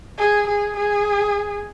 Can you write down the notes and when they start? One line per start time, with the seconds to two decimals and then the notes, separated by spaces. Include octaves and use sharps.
0.18 G#4
0.47 G#4
0.76 G#4